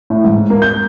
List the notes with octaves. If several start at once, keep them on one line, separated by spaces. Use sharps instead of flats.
A2
G#2
A#3
G6